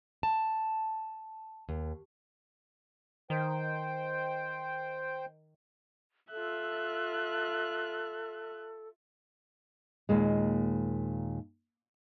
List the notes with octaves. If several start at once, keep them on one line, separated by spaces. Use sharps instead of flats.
A5
D#2
D#3 C5 G5
F4 A4 E5 F#6
D#2 A#2 G#3